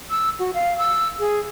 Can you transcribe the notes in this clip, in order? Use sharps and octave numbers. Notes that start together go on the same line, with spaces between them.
E6
F#4
F5
E6
G#4